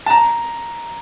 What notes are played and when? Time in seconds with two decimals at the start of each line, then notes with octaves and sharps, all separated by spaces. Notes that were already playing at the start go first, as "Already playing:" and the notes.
0.06 A5
0.10 A#5